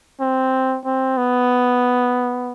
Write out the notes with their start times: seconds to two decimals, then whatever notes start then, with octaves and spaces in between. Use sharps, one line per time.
0.20 C4
0.85 C4
1.17 B3